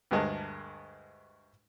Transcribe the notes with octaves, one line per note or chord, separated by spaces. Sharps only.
D2 G2 G#3 A#4 A5